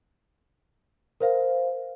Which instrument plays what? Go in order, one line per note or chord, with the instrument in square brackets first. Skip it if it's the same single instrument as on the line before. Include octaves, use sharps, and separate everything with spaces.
[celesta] A#4 C5 F5